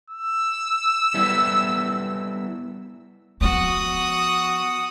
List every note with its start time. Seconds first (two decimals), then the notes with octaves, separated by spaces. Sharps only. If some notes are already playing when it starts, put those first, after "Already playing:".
0.10 E6
1.14 G3 B3 E4
3.41 F3 B3 F#4 D#6